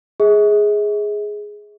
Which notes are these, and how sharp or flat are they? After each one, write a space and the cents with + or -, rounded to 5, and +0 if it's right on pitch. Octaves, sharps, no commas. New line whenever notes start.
G#4 +0 E5 -45